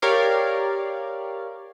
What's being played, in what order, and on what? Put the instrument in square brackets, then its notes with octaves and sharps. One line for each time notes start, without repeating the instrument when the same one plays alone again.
[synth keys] G4 A#4 C#5 D5 F5